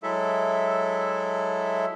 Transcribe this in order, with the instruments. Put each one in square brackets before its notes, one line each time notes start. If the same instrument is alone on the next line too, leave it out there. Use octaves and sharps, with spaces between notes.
[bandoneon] F#3 G#3 E4 A4 E5